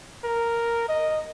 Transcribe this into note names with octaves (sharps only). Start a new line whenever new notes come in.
A#4
D#5